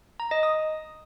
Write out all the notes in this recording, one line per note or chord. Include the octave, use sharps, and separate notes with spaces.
A#5
D#5
D#6